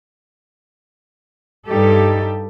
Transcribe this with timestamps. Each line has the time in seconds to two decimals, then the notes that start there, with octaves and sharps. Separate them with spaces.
1.67 G2 G3 D#4 G4 A4